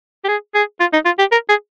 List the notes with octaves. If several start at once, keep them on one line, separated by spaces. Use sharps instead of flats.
G4
G#4
G#4
F4
D#4
F4
G4
A#4
G#4